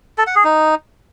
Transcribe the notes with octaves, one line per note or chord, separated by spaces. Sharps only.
A4
F#5
G#4
D#4